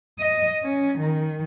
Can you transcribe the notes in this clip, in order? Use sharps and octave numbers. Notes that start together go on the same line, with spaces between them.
D#5
C#4
D#3